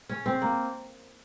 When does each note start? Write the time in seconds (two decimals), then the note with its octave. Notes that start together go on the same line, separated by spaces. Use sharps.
0.09 C#4
0.26 C4
0.42 A#3